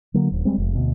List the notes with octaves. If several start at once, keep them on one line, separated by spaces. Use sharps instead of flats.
D3 F#3 A#3
D#1
G3 G#3 C4
F1
D2 B2